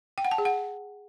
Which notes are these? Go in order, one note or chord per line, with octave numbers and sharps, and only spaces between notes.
G5
F#5
A5
G#4
F#5